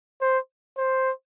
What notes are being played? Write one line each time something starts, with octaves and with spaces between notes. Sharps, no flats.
C5
C5